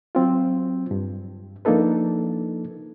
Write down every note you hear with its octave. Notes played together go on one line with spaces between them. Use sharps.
F#3 C4 F4
G2
F3 A#3 D4 D#4 A4 B4